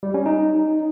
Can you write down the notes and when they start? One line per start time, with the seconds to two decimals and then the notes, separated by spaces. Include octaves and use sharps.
0.03 G3
0.14 C#4
0.26 D#4